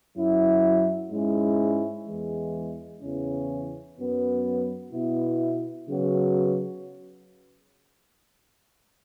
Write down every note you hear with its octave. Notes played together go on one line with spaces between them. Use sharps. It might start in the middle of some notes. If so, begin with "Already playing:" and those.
F#2 F#3 E4
G#2 G#3 C#4 E4
E2 E3 G#3
E2 C#3 E3 C#4
F#2 F#3 B3
B2 B3 E4
C#3 F#3 B3 F#4